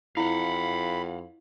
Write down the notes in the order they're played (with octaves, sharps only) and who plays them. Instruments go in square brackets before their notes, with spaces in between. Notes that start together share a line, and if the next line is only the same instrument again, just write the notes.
[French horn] F2 [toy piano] E4 [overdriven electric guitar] F5 F#5 [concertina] B5